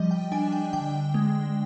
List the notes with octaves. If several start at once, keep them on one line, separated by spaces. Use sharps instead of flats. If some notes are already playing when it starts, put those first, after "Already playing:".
Already playing: F3 G3 D#5
G5
D4 G#5
G5
D3 G5
G#3